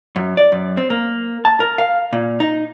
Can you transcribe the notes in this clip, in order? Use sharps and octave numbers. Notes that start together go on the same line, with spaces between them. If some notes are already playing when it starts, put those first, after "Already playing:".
F#2
D5
F#2
C4
A#3
A5
A#4
F5
A#2
D#4